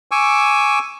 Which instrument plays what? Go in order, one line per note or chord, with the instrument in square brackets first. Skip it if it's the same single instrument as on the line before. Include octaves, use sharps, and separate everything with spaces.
[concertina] G#5 C#6 D6 E6